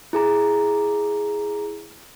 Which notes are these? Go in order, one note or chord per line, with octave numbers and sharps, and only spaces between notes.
E4 G#4 A#5